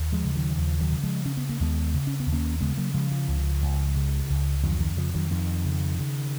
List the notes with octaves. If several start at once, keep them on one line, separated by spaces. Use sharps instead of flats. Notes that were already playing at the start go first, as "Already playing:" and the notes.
Already playing: D#2
F3 G#3
C#3
D#3 F#3
D#2 F3
D#3 F#3
C#3
F3 G#3
C#3 C#4
B3
A#3
D#2 G#3 B3
C#3
C#4
B3
D#2
A#3 C#4
C#3 G#3 B3
F#3 A#3
C#3 F3 G#3
F3
C#2
C#2
C#3
C#2
F2 D#3 F#3
D#3
C#3 F3
D#3 F#3
F2 D#3
C#3
C#3